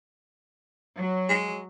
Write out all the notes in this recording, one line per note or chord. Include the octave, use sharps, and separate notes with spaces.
F#3
G#3